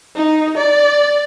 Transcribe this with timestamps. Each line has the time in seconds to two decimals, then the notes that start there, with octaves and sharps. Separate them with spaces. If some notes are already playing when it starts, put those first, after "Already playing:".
0.16 D#4
0.57 D5